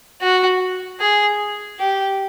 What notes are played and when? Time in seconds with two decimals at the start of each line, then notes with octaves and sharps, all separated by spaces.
0.21 F#4
1.00 G#4
1.79 G4